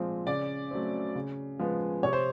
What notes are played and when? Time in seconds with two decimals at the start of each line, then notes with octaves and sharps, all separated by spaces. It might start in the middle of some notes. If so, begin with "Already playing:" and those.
Already playing: A#2 F3 G#3 C4
0.27 C#3 D5
0.71 F#3 A3 C4
1.16 C#3
1.59 F3 G#3 B3
2.03 C3 C#5
2.13 C5